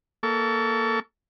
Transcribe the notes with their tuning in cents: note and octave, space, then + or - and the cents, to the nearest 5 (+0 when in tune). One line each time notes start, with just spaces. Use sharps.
A#3 +5 A4 +0 C#6 +35